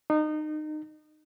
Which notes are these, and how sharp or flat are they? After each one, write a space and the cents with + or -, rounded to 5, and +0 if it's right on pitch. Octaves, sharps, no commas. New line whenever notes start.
D#4 -25